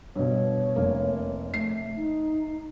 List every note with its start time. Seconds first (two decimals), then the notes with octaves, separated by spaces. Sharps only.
0.16 G2 B2 C#5
0.76 F1 A#3
1.54 A3 C7
1.96 D#4